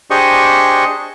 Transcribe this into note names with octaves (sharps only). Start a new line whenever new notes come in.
D4 G4 G#4 C5 D#5 C#6